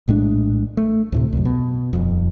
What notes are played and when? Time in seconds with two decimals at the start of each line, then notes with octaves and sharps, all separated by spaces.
0.08 A#1 A2 G#3 D4
0.77 A3
1.12 D2 A2 C3
1.33 C2 F#2
1.45 B2
1.93 D#1 F2